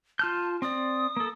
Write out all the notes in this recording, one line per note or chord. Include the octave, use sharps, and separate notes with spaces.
F4 A5 F6 G6
C4 D5 D#6
A#3 A4